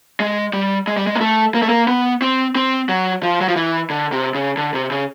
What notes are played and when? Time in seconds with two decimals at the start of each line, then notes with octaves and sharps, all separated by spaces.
0.20 G#3
0.53 G3
0.87 G#3
0.97 G3
1.07 G#3
1.16 A#3
1.21 A3
1.55 A#3
1.62 A3
1.69 A#3
1.88 B3
2.22 C4
2.55 C4
2.89 F#3
3.23 F3
3.41 F#3
3.48 F3
3.56 E3
3.90 D3
4.12 C3
4.35 C#3
4.57 D3
4.74 C3
4.91 C#3